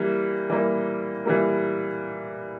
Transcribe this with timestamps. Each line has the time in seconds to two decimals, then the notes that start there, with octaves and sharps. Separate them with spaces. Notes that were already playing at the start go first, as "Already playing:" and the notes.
Already playing: E3 G3 A#3
0.50 E3 G3 A#3
1.26 E3 G3 A#3